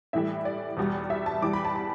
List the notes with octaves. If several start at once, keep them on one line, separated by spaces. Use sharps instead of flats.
A2 E3 G3 E5
D5
E2 B2 G3
E5
A5
E2 E3 G3 D6
B5
A5
B5